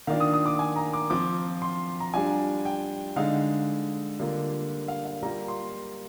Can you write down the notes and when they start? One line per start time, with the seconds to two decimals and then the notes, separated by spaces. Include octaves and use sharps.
0.07 D#3 A#3 D4 F4 F5
0.20 D#6
0.34 D#6
0.46 D6
0.59 G#5
0.76 A#5
0.93 D6
1.10 F3 C4 F4 D6
1.62 C6
2.00 A#5
2.13 G3 D4 F4 G#5
2.65 G5
3.16 D3 G#3 D#4 F5
4.20 D3 G3 A#3 D4 F4
4.88 F5
5.05 F5
5.23 G3 A#3 F4 A#5
5.48 C6